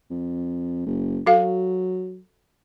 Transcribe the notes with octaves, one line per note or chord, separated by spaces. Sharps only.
F2
F#1
F#3 F#4 A4 F5